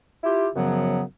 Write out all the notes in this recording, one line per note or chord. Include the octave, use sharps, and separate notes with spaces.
E4 F4 G4
F#2 C#3 F3 F#3 B3